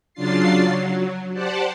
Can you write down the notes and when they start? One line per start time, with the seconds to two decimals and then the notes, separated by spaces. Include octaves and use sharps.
0.14 C#3 F#3 D4 F4 A6 C7
0.61 F#3
1.33 G4 C5 D5 F#5 A5